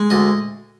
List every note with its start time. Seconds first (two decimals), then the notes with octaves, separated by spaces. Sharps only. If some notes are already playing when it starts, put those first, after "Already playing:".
Already playing: G#3
0.10 D2 D#5